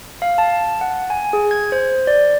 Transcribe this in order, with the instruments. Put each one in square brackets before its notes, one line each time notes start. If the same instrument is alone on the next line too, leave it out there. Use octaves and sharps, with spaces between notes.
[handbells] F5
A5
F#5
G#5
G#4
G#6
C5
D5